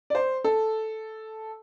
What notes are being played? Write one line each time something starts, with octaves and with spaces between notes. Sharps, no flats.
D5
C5
A4